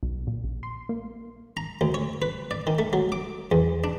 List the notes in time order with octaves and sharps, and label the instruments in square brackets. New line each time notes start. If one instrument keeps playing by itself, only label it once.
[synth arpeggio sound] B1
A#2
A#1
C6
A#3
[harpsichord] A#5
D2
C#5
B4
D5
D#3
A3
F#3
D6
E2
D4